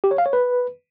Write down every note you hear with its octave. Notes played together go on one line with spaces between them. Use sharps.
G4
C#5
F5
C#5
B4